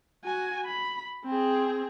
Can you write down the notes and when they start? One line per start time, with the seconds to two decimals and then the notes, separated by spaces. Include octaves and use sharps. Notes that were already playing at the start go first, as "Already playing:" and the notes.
0.24 F#4 G#5
0.66 B5
1.25 C4 G#4